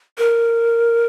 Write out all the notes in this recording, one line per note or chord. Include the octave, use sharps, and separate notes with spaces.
A#4